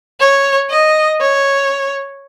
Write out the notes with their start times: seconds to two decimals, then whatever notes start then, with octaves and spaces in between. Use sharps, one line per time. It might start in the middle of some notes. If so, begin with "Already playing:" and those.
0.20 C#5
0.70 D#5
1.20 C#5